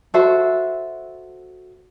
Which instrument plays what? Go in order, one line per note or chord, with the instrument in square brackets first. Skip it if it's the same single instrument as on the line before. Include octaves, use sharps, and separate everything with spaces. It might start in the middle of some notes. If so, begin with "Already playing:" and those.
[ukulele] F#4 A4 C5 E5